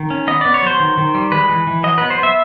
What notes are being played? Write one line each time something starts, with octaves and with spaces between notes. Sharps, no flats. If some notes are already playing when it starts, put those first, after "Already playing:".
Already playing: D#3
C#4
B3 D#5
B3 D5
C#5
F#3 C5
D#3
D#3
G3
G#3 B4
E3
E3
F#3 D#5
B3 B4
C5
B3 E5